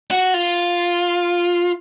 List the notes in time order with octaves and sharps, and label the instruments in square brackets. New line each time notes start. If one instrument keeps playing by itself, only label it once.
[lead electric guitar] F#4
F4